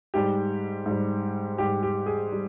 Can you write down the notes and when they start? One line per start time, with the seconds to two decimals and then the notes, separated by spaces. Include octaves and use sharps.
0.14 G#2 G3 G4
0.86 G#2 G3
1.58 G#2 G3 G4
1.83 G4
2.06 G#4
2.32 G3